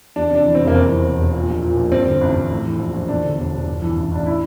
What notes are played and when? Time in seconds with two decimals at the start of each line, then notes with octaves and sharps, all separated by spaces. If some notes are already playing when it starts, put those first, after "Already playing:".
0.16 E2 D4
0.31 C3 D4
0.45 E3
0.55 F1 C4
0.67 A#3
0.74 E2 C4
0.89 E3
1.04 E1
1.18 E1
1.33 A#2
1.47 A#1
1.62 A#2
1.77 A#1
1.91 G2 C4
2.06 D3
2.21 A1
2.36 A1
2.50 A2
2.65 E3
2.79 A#1
2.93 A#1
3.09 E2 D4
3.23 D3
3.38 E1
3.52 E1
3.67 G2
3.82 E3
3.96 A1
4.11 A1 D4
4.26 E4